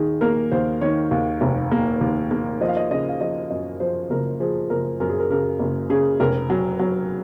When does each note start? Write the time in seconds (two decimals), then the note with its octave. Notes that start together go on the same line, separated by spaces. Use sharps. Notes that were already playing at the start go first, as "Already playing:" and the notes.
Already playing: D#2 D#3 G#4
0.21 A#3 A#4
0.52 D#2 C5
0.81 D#3 C#5
1.11 D#2
1.41 F1
1.72 A#3
2.01 D#2
2.31 A#3
2.61 F3 D#5
2.69 F5
2.77 D#5
2.91 C#3 D#5
3.09 F5
3.21 F3 D#5
3.50 F#2 D#5
3.80 F3 C5
4.10 F#1 A#4
4.40 F3 G#4
4.70 F#1 A#4
5.00 F#2 A#4
5.09 G#4
5.20 A#4
5.30 C#3 A#4
5.59 F#1
5.90 C#3 G#4
6.20 F1 A#4
6.50 F#3
6.80 F#3